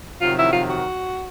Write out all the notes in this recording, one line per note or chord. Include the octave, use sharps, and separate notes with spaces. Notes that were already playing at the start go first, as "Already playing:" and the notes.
F2 C3 D#3 F#3 F4
E4
F4
F#4